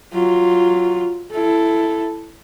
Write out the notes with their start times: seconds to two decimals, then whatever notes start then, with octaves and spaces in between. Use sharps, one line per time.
0.13 F#3 F4
1.32 E4 A4